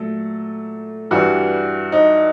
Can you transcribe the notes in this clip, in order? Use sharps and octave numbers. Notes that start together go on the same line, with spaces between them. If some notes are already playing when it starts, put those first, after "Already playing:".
Already playing: A#2 F#3 A3 A4
G2 E3 G3 F#4
D#4